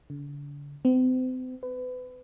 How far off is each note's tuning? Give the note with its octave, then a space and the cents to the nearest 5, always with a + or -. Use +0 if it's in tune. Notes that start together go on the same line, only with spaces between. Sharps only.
D3 -40
C4 -40
B4 +30